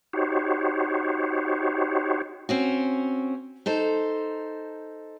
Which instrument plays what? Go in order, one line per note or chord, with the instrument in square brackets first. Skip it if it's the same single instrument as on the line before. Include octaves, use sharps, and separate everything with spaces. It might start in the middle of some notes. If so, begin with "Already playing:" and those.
[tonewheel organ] D#4 F#4 G4 C5 C#5
[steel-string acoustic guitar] C4 C#4 F#4
D#4 A4 C5